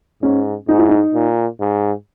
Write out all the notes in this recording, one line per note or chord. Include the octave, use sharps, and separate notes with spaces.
G#2 C#4
G#2 D#4
E4
D#4
A#2
G#2